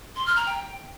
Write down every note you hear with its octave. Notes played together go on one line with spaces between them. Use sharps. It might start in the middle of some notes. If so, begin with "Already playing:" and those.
C6
F6
A#5
G5